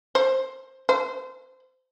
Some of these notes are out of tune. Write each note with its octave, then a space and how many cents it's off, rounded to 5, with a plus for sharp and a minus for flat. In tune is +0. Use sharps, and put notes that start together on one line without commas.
C5 +10
C5 -25